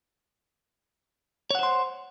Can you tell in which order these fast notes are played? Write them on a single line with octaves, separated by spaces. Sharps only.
C#5 F#5 C5 C6